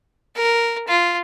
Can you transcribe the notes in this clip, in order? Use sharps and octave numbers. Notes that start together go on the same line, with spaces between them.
A#4
F4